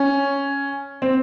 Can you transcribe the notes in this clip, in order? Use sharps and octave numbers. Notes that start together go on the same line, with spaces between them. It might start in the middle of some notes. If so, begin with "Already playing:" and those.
Already playing: C#4
C4